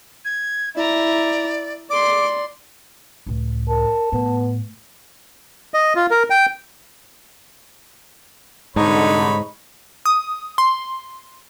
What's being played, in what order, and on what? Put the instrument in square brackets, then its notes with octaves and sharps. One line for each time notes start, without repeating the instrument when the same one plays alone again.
[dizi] G#6
[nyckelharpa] E4 A#5 [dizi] D5
[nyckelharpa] D5 C6 [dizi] D6
[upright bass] C#2 A2
[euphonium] A#4 [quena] A5
[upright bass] A2 [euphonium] B3
[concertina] D#5
F4
A#4
G5
[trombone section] C2 D3 [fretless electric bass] G#2 [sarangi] D#4 [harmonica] C#5 B5
[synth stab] D#6
C6